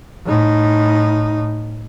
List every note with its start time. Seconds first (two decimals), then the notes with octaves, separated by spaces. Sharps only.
0.25 A2 D#4